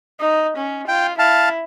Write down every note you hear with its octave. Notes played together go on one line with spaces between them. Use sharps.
D#4
C#4
F4 G5
E4 F5 A5